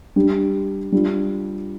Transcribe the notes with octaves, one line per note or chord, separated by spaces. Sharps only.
G3 D4 G4
G3 D4 F4